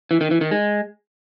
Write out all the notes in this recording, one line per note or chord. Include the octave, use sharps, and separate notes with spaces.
E3
D#3
E3
D#3
G#3